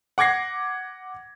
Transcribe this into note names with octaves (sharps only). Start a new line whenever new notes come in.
F#5 D6 G#6 A#6 C7